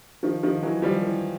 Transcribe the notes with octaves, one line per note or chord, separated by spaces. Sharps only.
D#3 F3
D#3 F3
E3 F#3
F3 G3
E3